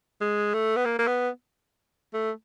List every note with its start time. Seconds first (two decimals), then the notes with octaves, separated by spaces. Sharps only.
0.21 G#3
0.54 A3
0.76 B3
0.85 A#3
0.99 A#3
1.07 B3
2.14 A3